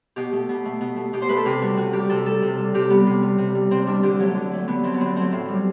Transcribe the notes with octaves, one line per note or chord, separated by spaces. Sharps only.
B2 G4
A3
B2
A3
B2
A3
B2 G4
C5
A3 B4
A4
C3 G4
G3 F#4
C3 F#4
G3 G4
C3 A4
G3 A4
C3
G3
C3 G4
G3 B3
C3
G3
C3
G3
C3 C4
G3 D4
D3 G4
F#3 A3
D3
F#3 A3
D3 B3
F#3 A3 C4
B3
D3 C4
F#3 A3 C4
A2
G3